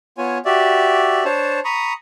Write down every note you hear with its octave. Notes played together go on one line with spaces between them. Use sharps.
B3 F4 C#5 G#5
F#4 G4 D5 E5
D4 C5 C#5 A5
A#5 B5 C#6 D#6